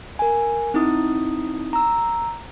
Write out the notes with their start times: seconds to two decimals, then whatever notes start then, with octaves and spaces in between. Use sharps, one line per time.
0.19 A#4 G#5
0.74 C4 D#4 E4 D#6
1.73 A#5 E6